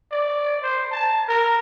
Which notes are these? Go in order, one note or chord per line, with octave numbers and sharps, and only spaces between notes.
D5
C5
A5
A#4